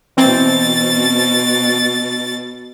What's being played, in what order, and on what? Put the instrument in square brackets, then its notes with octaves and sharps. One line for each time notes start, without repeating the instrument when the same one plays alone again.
[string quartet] B2 A6 [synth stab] E3 C4